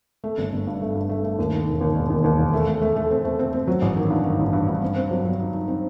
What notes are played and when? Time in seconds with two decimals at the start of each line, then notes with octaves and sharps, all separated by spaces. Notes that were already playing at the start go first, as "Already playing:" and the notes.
0.24 A3
0.38 G1
0.53 G1
0.67 G2
0.82 A3
0.95 G2
1.09 A3
1.24 A3
1.39 D#2
1.53 D#3
1.67 E1
1.81 D#2
1.96 E1
2.10 D#2
2.24 D#2
2.39 E1
2.53 A3
2.67 A3
2.82 A3
2.96 A3
3.11 C4
3.25 A3
3.39 C4
3.53 C4
3.67 F#3
3.82 A1
3.96 D#3
4.10 G2
4.24 D#3
4.39 A1
4.53 G2
4.68 G2
4.82 C4
4.96 C4
5.11 F#3
5.25 F#3
5.39 D#4
5.53 D#4
5.68 C4